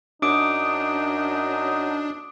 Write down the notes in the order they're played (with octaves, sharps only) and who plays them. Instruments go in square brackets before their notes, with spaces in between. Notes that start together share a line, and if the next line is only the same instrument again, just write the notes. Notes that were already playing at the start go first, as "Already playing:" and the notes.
[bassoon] F#2 [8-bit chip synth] D4 [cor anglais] D#4 [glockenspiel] D6 D#6 D7